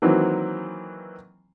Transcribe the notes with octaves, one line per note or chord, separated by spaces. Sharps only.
D#3 E3 F#3 A#3 C4